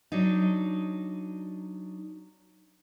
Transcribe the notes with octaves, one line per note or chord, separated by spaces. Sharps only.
F#3 D4 D#4